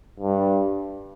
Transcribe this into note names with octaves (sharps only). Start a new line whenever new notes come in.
G2